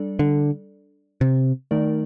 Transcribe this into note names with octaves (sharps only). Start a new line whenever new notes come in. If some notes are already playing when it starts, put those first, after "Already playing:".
Already playing: G3 D4 A4 D5
D3
C3
D#3 A3 D#4 A#4 D5